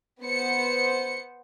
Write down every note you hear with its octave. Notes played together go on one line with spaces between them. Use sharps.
B3 C5 C#7